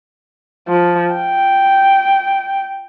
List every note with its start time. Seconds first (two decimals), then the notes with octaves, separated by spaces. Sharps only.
0.68 F3
1.13 G5